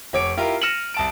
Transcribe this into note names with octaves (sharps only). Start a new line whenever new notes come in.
F1 C#5 D6 D7
E4 F4 G4 A#4
F6 A#6 C#7 D#7 E7 F#7
C2 A5 D7